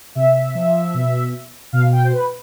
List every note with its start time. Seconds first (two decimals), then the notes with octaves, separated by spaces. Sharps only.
0.15 C3 E5
0.55 F3
0.94 B2
1.73 B2 F5
1.92 G5
2.04 C5
2.12 B4